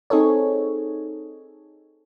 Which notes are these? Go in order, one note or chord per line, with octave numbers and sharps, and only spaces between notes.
C4 D#4 G#4 A4 C#5